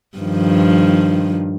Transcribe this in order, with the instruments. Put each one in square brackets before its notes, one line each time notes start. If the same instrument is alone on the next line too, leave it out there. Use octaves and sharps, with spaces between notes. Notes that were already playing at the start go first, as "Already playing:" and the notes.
[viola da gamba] G2 D#3 F3